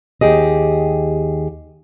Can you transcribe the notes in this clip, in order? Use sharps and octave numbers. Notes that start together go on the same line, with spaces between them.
D#2 G4 G#4 D#5